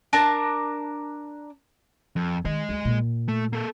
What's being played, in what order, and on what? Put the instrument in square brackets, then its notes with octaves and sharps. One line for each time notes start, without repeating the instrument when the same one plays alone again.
[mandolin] D4 A#4 A5 A#5
[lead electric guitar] F2
[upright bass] D#3 [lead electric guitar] G#3 D#5
[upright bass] D2
A#2
[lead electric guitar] A3
A#3 A4